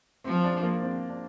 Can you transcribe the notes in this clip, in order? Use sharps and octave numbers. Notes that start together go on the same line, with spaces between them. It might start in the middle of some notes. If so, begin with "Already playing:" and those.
F3 C4
D4
A#3
C4
D4